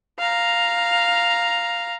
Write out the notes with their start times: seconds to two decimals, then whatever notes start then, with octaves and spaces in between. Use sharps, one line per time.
0.19 F5 A#5